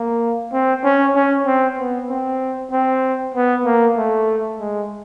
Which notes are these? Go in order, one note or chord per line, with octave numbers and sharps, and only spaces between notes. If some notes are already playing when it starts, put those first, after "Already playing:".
Already playing: A#3
C4
C#4
C#4
C4
B3
C4
C4
B3
A#3
A3
G#3